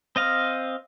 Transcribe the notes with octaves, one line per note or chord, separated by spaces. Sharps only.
C4 D#5 F5